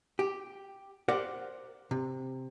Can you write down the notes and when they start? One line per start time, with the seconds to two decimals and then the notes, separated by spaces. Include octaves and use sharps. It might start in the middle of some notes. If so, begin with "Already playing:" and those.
0.19 G4
1.08 G4 A#4 C5 D5 F5 F#5
1.91 C3